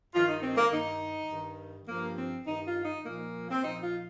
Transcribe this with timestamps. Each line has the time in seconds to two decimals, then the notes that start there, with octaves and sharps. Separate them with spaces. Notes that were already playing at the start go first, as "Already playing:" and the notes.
0.13 G2 D#3 F4
0.27 D#4
0.42 C4
0.56 A#3
0.71 G2 D#3 D#4
1.29 G2 D#3
1.87 G2 F3 A#3
2.17 C4
2.46 G2 D#3 D#4
2.65 F4
2.85 D#4
3.03 A#2 F3 A#3
3.50 C4
3.63 A#2 F3 D#4
3.82 F4